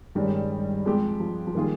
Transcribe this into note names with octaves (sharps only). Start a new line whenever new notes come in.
G2 D#3 G3 G#3 C#4
F3 G#3 C4 G4
F3
F3
D#3 G3 A#3 F4 G#4